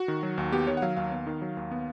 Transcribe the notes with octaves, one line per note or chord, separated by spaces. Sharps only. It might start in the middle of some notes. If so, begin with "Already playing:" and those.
Already playing: F#4
D#3
F#3
D#2
B3 G4
D#3 C#5
F#5
F#3 F5
D#2 F5
B3
D#3
F#3
D#2
B3